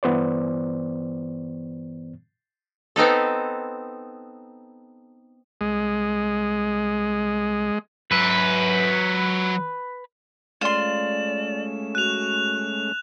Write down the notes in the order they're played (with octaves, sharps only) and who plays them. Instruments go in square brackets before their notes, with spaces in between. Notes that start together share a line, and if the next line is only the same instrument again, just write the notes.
[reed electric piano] G2 E3 B3 C5 D5
[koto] B3 C4 D#4 A4
[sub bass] C2 [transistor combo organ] G#3
[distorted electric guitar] F#3 E5 [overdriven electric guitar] B4
[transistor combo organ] G#3 A3 C#4 [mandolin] F4 C6 [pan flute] D5 [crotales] E7
[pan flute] F#4 [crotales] F#6 F7